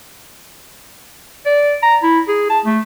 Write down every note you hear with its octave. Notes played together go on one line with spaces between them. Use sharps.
D5
A#5
E4
G#4
A5
A3